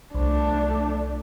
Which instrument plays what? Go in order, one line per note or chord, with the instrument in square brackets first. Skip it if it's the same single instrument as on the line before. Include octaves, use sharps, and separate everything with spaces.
[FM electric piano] C2 [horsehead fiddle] A3 D4